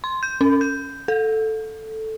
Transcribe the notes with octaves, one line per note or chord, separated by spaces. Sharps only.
C6
G6
C#4
G6
A4